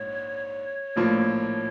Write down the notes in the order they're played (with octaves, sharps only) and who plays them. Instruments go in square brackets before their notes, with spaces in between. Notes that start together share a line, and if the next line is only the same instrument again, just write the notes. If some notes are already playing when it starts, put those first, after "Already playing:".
Already playing: [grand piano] A#1 G#2 [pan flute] C#5
[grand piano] A#1 A2 F3 A#3